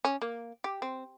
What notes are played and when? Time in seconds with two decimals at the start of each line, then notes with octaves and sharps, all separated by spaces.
0.05 C#4
0.22 A#3
0.64 G4
0.82 C4